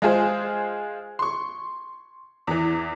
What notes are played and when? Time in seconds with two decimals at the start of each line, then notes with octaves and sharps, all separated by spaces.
0.02 G#3 F4 G#4 C5
1.19 C6 C#6
2.47 E2 E3